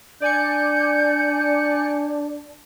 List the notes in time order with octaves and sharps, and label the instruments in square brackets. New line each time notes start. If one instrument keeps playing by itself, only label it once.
[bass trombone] D4 [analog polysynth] D5 G#5 C#7 [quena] G6